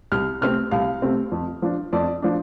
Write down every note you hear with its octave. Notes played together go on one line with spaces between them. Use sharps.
C2 F6
C3 A3 C4 F6
C2 F5
C3 A3 C4
F2
F3 D4
F2 D5
F3 D4